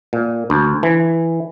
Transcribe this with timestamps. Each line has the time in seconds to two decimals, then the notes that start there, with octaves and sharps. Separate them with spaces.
0.13 A#2
0.50 D2
0.83 E3